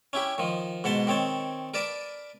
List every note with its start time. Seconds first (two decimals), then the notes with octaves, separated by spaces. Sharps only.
0.13 C#4 E4 G4
0.38 D#3 F3
0.84 G#2 B2 F#5 A5 C6
1.07 D#3 C4 C#5 A5
1.74 A#4 B4 D5 A5